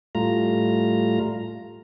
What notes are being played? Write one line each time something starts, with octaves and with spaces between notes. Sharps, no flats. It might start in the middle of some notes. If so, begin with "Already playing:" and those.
A2 G3 A3 F4 A#5